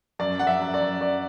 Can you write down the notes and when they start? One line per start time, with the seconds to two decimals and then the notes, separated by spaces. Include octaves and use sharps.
0.19 F#2 D5
0.39 F#2 F#5
0.47 E5
0.61 F#2
0.74 D5
0.81 F#2
1.01 F#2 D5